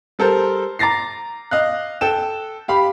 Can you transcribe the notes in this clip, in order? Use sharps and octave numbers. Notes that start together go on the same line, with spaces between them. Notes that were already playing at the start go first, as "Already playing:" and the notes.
G3 A4 A#4 C5
A#5 D6 A6 A#6 C7
D#5 F5 F#6
A4 G5 E7
G4 F5 B5